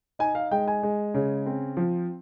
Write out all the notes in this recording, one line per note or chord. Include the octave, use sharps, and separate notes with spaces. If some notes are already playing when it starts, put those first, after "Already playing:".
D#4 G#5
F5
G#3 G5
G#5
G#3
C#3
C4
F3